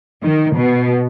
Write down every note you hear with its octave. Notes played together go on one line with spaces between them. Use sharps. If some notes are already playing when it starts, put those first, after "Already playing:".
D#3
B2